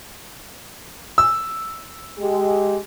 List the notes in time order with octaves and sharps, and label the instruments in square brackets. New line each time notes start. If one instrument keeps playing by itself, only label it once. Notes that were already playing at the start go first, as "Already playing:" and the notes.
[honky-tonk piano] E6
[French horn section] G#3 G4